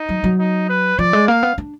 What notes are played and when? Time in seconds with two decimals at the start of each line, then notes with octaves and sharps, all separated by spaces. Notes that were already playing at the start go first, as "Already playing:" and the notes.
Already playing: D#4
0.09 F#3
0.24 F#3
0.39 D#4
0.69 B4
0.99 F3 D5
1.13 G#3
1.27 A#3 F5
1.43 B3
1.58 D4